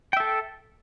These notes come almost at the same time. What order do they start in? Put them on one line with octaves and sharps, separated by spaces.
G5 E5 A4